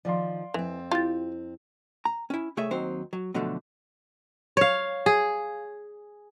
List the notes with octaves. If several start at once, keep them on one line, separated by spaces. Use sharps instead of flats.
D#3 F3 D5 F5 C6
F2 E3 C4
E4 F4 G4 A6
A#5
C#4 E4
C2 A3 G#4 C#5 E5
D#2 F#3 C4 D#4 C5
F#3
B2 D3 F3 F#3 A3
C#5 F5
G#4